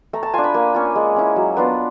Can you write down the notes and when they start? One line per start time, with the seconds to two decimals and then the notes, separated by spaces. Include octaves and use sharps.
0.13 A3 A#5
0.23 A5
0.34 D4 F4 G#5
0.44 B5
0.54 A#3
0.74 C#4 F4
0.96 G#3
1.16 C#4 E4
1.36 F#3
1.57 B3 D4 F4